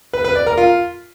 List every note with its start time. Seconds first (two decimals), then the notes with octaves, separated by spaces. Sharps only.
0.13 B4
0.24 B4
0.35 D5
0.46 A#4
0.57 F4